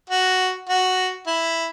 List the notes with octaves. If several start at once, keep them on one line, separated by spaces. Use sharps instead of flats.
F#4
F#4
E4